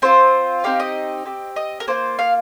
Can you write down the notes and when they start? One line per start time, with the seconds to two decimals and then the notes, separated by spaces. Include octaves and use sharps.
0.02 C4 F4 C5
0.64 C4 D#4 G4 F5
0.80 D#5
1.25 C4 G4
1.56 D#5
1.80 A#4
1.88 A#3 F4 C5
2.19 F5